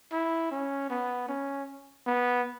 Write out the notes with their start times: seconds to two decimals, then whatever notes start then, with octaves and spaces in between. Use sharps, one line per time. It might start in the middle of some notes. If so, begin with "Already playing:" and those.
0.12 E4
0.51 C#4
0.90 B3
1.28 C#4
2.07 B3